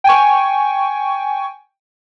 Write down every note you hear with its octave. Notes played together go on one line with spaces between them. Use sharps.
G5 G#5 C#6